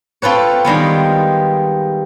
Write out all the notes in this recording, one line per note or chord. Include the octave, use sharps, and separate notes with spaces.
C4 F4 A4 B4 C#5
D#3 G3 G#3 B3